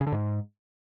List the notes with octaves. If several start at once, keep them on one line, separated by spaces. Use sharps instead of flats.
C#3
D3
G#2